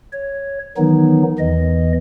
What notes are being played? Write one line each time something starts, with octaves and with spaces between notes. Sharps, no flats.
C#5
D#3 E3 F#3 B3 D#4
E2 E3 D#5